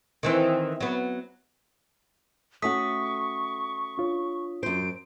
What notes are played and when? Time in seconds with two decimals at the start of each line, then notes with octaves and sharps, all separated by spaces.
0.23 D#3 E3 C4
0.80 F#3 B3
2.62 A3 C#4 F#4 C#6 D#6 B6
3.98 D4 F4 C#5
4.63 F#2 C5 D7